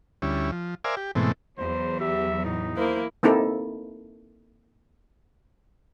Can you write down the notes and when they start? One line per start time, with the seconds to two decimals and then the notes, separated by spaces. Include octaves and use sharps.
0.22 D2 G3 C#4 E4
0.52 F3
0.84 A#4 C5 D5 E5 F5 G#5
0.97 G4
1.15 G#2 B2 E3 A3 C4
1.58 E2 F#3 C5
2.00 G4 E5
2.45 A2 D#4
2.77 A#3 E4 C5
3.23 A#3 C4 D#4 E4 A4